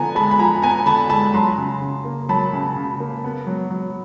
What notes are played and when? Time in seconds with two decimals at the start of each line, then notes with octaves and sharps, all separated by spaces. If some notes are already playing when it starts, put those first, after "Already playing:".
Already playing: D3 F3 B3 G#5 A#5
0.15 G#3 A5 B5
0.31 B5
0.39 F3 G#5 A#5
0.62 B3 G#5 A#5
0.86 D3 A5 B5
1.10 G#3 A5 B5
1.34 F#3 A#5 C6
1.58 C#3
1.82 C#3
2.05 A#3
2.29 F#3 A5 B5
2.53 C#3
2.77 C#3
3.00 A#3
3.24 B3
3.47 F#3
3.71 F#3